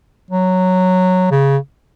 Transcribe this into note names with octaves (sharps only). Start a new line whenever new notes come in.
F#3
C#3